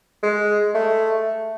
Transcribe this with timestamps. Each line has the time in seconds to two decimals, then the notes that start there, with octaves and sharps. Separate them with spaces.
0.23 G#3
0.75 A3